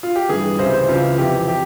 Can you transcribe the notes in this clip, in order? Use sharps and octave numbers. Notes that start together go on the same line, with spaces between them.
F4
G4
G2 E3 G#4
C#2 C3 E3 C5
C5
C#2 C#3 E3 F4
F2 C3 E3 G4
G4